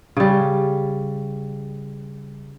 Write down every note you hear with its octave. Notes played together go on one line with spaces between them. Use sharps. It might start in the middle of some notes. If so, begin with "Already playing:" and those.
C#3 G3